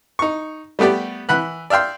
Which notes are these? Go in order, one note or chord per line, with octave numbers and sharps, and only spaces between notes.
D#4 C#6
G3 A3 B3 G4 D5
E3 F#5 B5 F#6
D5 E5 F5 G5 C6